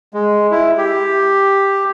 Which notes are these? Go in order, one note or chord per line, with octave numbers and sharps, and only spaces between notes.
G#3
E4
G4